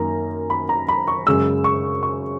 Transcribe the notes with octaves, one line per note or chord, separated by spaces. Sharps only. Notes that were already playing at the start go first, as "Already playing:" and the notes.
Already playing: F#2 D#3 A#3 A#5
B5
A#5
B5
C#6
F#2 C#3 G#3 E6
C#6
C#6